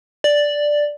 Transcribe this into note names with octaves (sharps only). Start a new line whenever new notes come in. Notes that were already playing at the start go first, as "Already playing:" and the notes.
D5